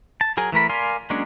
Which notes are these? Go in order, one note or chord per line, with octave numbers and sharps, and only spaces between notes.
A5
F#3 G#4 A#4 G#5
E3 A3 A#4 B5
A#4 D5 F5 G#5 C6
F#3 G#3 A#3 C#4 D4